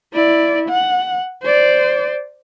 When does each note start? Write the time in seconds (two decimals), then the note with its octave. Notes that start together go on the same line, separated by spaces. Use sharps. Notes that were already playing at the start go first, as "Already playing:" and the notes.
0.13 E4 D5
0.69 F#5
1.43 C5 D5